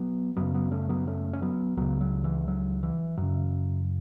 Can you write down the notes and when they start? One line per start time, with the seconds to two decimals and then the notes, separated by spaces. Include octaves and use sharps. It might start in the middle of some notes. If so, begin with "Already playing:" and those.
Already playing: F#3 B3
0.37 F#2 C#3 F#3 B3
0.54 F#3 B3
0.71 A3 C#4
0.89 F#3 B3
1.07 A3 C#4
1.33 C#4
1.42 F#3 B3
1.77 C#2 C#3 F#3 B3
2.01 F#3
2.24 E3
2.48 F#3
2.83 E3
3.18 F#2 C#3 F#3